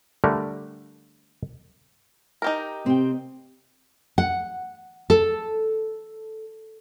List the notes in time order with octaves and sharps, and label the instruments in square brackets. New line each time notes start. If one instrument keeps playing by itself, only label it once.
[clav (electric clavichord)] D3 G3 A3 A#4
[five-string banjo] D#4 G4 A#4
[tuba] C3 [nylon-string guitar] C4 G5
[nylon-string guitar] F#5
A4